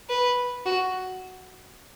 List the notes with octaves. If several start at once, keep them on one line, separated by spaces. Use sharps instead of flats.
B4
F#4